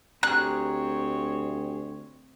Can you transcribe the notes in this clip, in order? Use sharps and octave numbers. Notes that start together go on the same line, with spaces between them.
D2 C4 G4 G#4 C#5 A#5 F#6